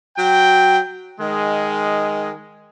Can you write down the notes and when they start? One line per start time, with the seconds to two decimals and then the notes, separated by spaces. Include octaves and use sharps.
0.18 F#3 G5
1.20 D#3 G#3